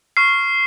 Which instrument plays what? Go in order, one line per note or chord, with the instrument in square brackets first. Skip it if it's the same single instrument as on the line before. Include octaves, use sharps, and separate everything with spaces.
[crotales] C#6 F6 C7